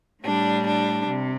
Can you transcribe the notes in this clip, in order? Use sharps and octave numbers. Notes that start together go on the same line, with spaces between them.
A2 G3 D4
D4
C3